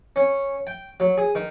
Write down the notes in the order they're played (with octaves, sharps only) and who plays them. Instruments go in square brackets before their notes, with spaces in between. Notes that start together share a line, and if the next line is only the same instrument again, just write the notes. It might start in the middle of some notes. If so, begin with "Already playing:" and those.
[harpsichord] C#4
G5
F#3
G#4
D#3